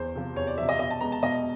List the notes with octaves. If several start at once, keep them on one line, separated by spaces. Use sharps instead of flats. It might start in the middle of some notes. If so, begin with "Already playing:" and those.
Already playing: E2 C5
C3 F3
E2 C#5
D5
C3 F3 E5
D#5
B2 D#5
A5
G#3 B3 A#5
A5
B2 D#5